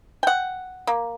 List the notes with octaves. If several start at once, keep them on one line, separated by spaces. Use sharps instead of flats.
F#5 G5
A#3